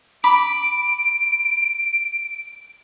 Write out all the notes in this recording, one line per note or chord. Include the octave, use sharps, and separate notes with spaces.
B5 D6 D7